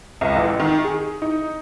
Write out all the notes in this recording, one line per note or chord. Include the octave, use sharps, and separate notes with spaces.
C#2
A1
D#3
G#4
D#4